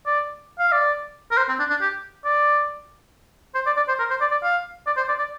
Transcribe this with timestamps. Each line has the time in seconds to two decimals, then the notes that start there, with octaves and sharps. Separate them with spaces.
0.06 D5
0.59 F5
0.72 D5
1.31 A#4
1.37 C5
1.48 C4
1.59 D4
1.70 D4
1.81 G4
2.24 D5
3.55 C5
3.66 D5
3.76 D5
3.88 C5
3.99 A#4
4.10 C5
4.20 D5
4.31 D5
4.43 F5
4.86 D5
4.96 C5
5.08 D5
5.19 D5